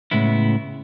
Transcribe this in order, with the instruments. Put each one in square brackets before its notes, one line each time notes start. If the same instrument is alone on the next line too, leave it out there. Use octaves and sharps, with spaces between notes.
[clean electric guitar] A2 C#3 G#3 B3 E4